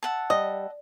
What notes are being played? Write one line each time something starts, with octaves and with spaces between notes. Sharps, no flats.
E5 F#5 A5
G3 D#5